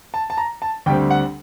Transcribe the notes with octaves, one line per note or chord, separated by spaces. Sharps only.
A5
A5
A#5
A5
D2 D3 G3 C4 G5
F#5